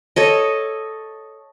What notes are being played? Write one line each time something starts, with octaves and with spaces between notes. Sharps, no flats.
A4 C#5 D#5